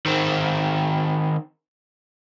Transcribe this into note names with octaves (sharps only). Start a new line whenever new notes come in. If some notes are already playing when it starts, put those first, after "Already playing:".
D#3 C4